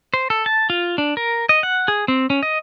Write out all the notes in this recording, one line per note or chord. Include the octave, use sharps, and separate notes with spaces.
C5
A4
A5
F4
D4
A#4
D#5
F#5
G#4
C4
C#4
D#5